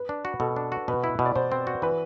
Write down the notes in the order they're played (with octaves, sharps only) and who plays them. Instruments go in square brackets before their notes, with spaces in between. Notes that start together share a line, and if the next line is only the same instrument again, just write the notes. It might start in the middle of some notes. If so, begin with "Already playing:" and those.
Already playing: [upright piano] B4
[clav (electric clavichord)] D4
F#4
[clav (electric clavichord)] B2 [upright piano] A4
[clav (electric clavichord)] D4
F#4
[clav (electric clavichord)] B2 [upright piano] B4
[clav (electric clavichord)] E4
B2
[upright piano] D5
[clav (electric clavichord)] B2 [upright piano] C5
[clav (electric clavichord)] C4
F#4
[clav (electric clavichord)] E3 [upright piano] B4